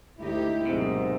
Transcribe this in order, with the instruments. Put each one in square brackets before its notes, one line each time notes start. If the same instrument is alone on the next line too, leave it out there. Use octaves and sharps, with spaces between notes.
[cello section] D2 D#4 G4 [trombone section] D3 E4
[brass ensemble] B1 G#2 [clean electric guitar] C3 [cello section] A#3